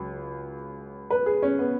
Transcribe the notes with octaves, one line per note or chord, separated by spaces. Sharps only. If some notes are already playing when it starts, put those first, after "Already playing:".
Already playing: C#2 C#3 F#3
B4
G#4
C#4
B3